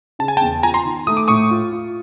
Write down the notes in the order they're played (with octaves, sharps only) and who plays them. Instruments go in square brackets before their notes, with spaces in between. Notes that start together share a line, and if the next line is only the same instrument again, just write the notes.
[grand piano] C#3 [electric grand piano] A5
[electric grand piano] G#5
G5 A5
[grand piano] E2
[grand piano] F4 [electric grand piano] G#5 A#5
[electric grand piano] A#5 C6
[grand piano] D#3
[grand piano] A3 [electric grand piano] D#6
[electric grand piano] D6
[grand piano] A2 [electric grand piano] C#6 D#6
[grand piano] F4
F4